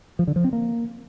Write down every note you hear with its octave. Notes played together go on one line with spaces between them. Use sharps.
F3
D3
F3
C4
A#3